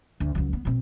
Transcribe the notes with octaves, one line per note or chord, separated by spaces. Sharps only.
D2
C#2 F#3
B3
B2 C4